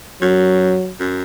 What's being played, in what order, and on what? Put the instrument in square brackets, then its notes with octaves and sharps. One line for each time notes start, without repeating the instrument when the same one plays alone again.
[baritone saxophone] F#2 [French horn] F#3
[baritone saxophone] F#2